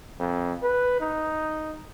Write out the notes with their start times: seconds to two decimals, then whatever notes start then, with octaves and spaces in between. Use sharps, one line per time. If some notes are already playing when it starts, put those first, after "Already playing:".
0.20 F2
0.62 B4
1.00 D#4